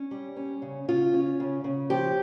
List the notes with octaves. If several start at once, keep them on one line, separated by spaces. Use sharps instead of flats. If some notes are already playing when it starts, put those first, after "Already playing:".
Already playing: C#4
G3
C#4
C#3
C#3 F4
C#4
C#3
C#3
F3 G4